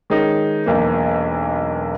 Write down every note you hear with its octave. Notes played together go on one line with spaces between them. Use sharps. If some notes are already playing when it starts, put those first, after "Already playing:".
D#3 G#3 C#4 D#4
E1 B1 A#3